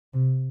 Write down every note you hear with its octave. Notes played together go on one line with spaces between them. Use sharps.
C3